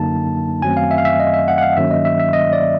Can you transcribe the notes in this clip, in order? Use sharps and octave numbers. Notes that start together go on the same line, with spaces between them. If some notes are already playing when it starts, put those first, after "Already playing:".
Already playing: F#2 D3 F#3 A#3 D#4 A5
F#2 D#3 F#3 A3 C4 G#5
F5
E5
F5
E5
D#5
E5
F#5
F#5
F5
G2 D#3 F#3 A#3 C#4 E5
D#5
E5
E5
D#5
D5